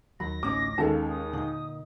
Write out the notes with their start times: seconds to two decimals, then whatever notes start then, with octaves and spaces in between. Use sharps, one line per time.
0.20 D#2 D#3 F#3 B5 A#6
0.43 A1 D2 A2 C#4 D#4 D6
0.78 D#2 G#3 C#4 A4 F5 A5
1.09 D#6
1.33 A#2 D3 D4 D#4